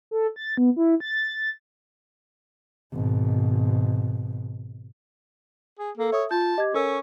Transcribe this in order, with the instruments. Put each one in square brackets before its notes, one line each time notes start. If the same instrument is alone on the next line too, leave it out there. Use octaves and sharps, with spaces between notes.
[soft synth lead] A4
A6
B3
E4
A6
[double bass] G#1 B2
[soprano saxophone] G#4
[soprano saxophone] A#3 [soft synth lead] A4
[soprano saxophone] C#5 [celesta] E5 D#6
[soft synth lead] F4 [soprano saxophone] A5 [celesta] G6
[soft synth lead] G4 [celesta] D#5 G#6
[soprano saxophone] C#4 [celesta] A4 A#4 E6 [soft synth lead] C#6